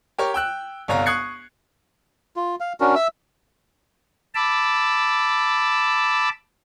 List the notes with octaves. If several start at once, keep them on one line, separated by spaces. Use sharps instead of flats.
G4 A#4 C#5
G5 E6 F#6
G1 C2 C#5 F5 A#5
C#6 D#6 F#6 G#6 C7 C#7
F4
F5
C#4 D4 F#4 A#4
E5 E6
A5 B5 D6 E6